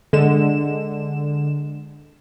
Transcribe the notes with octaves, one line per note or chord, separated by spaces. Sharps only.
D3 G#3 E7